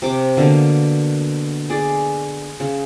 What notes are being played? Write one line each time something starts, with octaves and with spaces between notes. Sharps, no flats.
C3 D6
B2 D3 A#3
G#4 D5
C#3